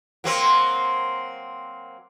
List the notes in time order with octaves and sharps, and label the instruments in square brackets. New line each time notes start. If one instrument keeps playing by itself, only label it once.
[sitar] F#3 A#3 C4